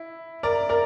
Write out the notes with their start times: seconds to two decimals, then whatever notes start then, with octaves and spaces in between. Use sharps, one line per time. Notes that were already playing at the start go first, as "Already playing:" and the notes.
Already playing: E4
0.43 A#4 D5
0.69 A#4 D5